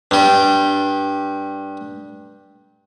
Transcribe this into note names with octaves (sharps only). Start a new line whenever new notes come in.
G2 G3